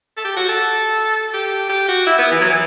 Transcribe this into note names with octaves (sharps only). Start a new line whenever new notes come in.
A4
G4
F#4
A4
G4
G4
F#4
E4
B3
E3
F#3
E3